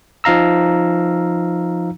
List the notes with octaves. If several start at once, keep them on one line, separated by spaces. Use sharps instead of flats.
F3 D#4 F5 A#5 E6